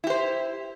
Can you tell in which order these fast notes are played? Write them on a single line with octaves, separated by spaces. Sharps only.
E4 G4 C5